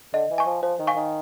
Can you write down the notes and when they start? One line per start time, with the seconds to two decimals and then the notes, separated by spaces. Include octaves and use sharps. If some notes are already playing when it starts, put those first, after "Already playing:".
0.13 D3 D#5
0.31 E3
0.38 G#5 C#6
0.46 F3
0.62 F3 C5
0.79 D#3
0.87 F5 G#5 C#6
0.96 D#3